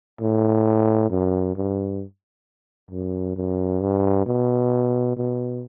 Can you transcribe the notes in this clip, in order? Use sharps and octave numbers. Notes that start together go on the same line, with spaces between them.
A2
F#2
G2
F#2
F#2
G2
B2
B2